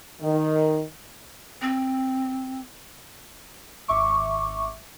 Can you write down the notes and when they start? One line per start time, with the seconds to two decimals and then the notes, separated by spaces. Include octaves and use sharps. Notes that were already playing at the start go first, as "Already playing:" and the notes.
0.22 D#3
1.62 C4
3.88 G#1 E5 C#6 D6